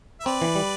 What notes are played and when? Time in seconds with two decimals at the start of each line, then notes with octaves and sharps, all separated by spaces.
0.20 E5
0.26 C4 B4 D5
0.42 E3
0.55 G3